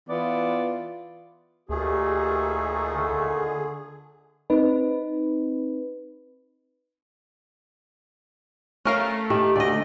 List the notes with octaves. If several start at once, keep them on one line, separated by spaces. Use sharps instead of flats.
E3 B3 F4 D5
D2 A#2 D#3 A3 G4 G#4
D3
C4 D#4 B4
A3 C#4 A#4 F5
D#3 G4
D2 D5 D#5